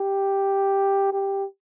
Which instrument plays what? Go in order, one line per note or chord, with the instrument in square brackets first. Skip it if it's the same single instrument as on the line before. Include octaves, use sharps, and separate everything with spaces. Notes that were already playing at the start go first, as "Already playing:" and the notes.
Already playing: [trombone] G4
G4